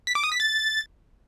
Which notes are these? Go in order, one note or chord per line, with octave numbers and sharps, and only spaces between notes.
B6
D6
D#6
B6
A6